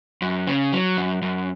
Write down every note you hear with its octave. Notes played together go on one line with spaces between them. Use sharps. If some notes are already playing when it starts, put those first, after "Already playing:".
F#2
C#3
F#3
F#2
F#2